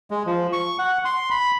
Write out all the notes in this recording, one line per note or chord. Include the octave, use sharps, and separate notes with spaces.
G#3
F3
C#6
F#5
C6
B5